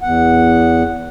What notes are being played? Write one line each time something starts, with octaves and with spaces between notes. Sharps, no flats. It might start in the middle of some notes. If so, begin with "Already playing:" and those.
E2 F#5